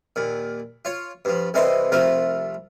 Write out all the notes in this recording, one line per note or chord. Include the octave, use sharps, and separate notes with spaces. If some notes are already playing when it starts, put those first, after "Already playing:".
D#2 A#2
F4 C#5
G2 F3
C2 C3 E3 D5 D#5 C6
C2 F3 A3 F4 A#4